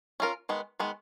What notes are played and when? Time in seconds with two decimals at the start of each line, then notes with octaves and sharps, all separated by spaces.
0.20 C#4 F4 A#4
0.49 D#3 G#3 B3
0.80 D#3 G#3 B3